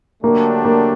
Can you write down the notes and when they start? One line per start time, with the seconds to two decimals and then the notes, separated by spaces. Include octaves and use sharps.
0.23 D3 F#3 A3 A#3 D4 G4
0.65 A#3